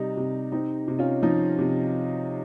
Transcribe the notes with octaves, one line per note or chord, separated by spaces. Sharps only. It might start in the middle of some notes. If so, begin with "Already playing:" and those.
Already playing: C3 G3 D#4
C3
C4 D#4
C3
C#4 F4
F3 D#4
C3